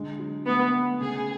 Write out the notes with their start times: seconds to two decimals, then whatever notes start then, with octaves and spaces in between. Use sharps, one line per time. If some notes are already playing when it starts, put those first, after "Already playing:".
Already playing: D3 G#3
0.19 F#3
0.46 A3 B3
0.73 A3
0.99 C#3 G#4